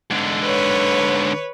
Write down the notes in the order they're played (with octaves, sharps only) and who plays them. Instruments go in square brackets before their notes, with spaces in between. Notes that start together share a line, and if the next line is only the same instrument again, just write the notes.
[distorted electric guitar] G#2 D3
[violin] B4 C#5